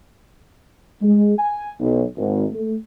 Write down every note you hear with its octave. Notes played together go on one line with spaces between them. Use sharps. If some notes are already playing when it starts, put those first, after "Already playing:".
G#3
G#5
B1
G#1
A3